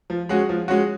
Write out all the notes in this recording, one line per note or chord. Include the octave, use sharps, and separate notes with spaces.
F3
G#3 C#4 F#4
F3
G#3 C#4 F#4